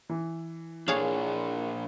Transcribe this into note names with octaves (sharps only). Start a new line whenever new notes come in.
E3
A#2 D4 G#4 C#5 F5